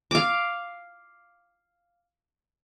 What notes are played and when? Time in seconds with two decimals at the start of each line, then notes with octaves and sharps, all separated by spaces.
0.11 F5 D6